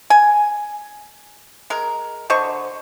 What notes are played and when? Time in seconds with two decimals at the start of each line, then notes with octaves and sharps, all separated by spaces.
0.10 G#5
1.70 G#3 A#4
2.30 D3 C5 D#5 C#6